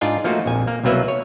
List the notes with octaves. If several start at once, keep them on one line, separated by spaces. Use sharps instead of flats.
G#2 D4 F4 D5 D#5 G#5
F3 A3 A#3 D#4 F4 F#4
A#1 F2 G#5
A#3
C2 B2 F#3 A#3 B4 E5
C#5